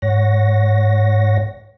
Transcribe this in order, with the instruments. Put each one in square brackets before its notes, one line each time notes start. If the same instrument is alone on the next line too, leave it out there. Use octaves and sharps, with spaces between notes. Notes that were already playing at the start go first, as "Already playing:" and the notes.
[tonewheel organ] G#2 C#5 F#5 A#6